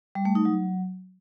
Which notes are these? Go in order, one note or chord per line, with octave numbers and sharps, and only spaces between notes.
G3
A3
D#4
F#3